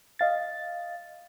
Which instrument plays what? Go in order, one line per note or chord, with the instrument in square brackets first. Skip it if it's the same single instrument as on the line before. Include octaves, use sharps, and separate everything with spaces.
[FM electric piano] D#5 F5 A6